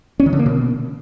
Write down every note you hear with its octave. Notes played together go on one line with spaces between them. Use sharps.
C#4
D#3
D3
A#3
B2